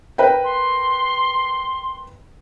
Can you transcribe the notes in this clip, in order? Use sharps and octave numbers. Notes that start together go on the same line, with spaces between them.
A#4 B4 G5
C6